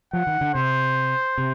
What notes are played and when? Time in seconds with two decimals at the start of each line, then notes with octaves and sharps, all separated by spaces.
0.13 F3 F#5
0.27 D#3
0.41 D3
0.54 C3 C5
1.38 C3